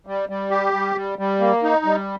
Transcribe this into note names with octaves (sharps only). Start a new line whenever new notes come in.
G3
G3
G4
G3
G3
G3
A#3
D#4
G3